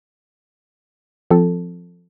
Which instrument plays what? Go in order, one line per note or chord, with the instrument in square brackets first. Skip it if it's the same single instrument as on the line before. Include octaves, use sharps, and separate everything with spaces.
[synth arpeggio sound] F3 C4 A4